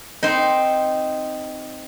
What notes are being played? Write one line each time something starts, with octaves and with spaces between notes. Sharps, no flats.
C4 D#4